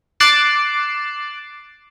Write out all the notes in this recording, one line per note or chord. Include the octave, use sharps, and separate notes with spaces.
D6 F#6 A6 C7 D7 E7